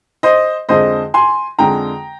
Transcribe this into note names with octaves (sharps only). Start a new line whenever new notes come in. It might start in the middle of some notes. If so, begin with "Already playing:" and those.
C5 D#5
F2 D3 G#3 C5 D#5
G#5 C6
F2 D3 G#3 G5 A#5